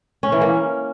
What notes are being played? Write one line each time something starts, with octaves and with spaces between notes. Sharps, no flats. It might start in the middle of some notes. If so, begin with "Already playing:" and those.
C#4
E3
A#3